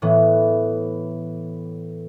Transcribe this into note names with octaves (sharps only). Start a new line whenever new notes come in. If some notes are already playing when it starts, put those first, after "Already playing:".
A2 E3 B3